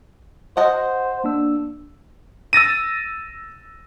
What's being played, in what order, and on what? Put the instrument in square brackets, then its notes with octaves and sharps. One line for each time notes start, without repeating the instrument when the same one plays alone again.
[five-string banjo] F#4 D#5 F#5 [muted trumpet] C5
[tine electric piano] A#3 D4 E6
[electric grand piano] E6 A6 A#6 D#7